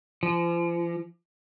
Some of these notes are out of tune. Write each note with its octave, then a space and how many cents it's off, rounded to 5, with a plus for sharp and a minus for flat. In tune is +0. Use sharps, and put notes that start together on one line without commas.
F3 -40